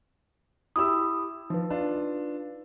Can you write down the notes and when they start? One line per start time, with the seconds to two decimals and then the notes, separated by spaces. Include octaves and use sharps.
0.76 E4 G4 D#6 E6
1.50 F3 D#4 B4
1.70 D4 F4